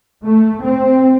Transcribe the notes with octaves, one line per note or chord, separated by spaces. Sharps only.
A3
C4